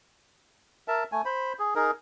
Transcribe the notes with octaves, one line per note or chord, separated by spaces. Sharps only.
A#4 E5 A5
A3 G#5
C5 B5
G#4
D#4 G#4 A#4